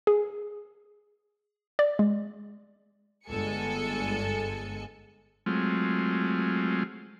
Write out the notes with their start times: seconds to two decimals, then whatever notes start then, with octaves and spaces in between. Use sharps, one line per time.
0.07 G#4
1.79 D5
1.99 G#3
3.27 G1 G#3 A4 G#5 C#7
5.46 F#3 G#3 A3 C4 F4